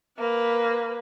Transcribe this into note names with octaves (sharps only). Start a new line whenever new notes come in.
A#3 B4